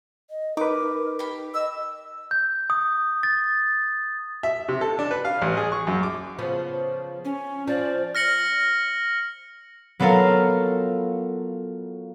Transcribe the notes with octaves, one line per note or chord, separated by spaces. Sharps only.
D#5
D#4 A#4 B4 D6
G4 B5
D#5 E6
G6
D#6
A6
E5
C3
A4
D4
B4
F5
A1
G#4
C#6
F#2
D6
C#3 F3 B3
C#4
F3 D5
F6 A#6 C#7 F#7
F#3 B3 F4 A4 A#4 F5